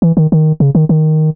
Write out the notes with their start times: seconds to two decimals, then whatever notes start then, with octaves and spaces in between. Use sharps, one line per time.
0.02 E3
0.17 D#3
0.32 D#3
0.60 C#3
0.75 D#3
0.89 D#3